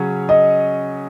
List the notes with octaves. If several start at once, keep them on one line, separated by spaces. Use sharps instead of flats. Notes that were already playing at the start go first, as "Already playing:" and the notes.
Already playing: C#3 F#3 C#4
D#5